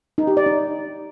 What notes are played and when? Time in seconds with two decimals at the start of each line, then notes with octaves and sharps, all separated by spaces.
0.18 D#4
0.27 G4
0.37 D5
0.46 D#4